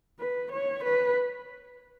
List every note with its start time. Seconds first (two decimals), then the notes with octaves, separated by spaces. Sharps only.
0.19 B4
0.52 C#5
0.84 B4